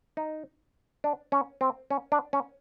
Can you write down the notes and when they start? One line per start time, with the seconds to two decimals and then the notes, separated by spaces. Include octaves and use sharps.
0.17 D#4
1.04 D4
1.32 C#4
1.61 C4
1.90 C#4
2.12 D4
2.33 C#4